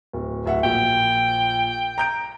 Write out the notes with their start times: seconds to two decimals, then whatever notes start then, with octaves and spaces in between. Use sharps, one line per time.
0.13 D1
0.46 D1 E5 F#5
0.64 A#1 G5
1.98 A#5 G6 D7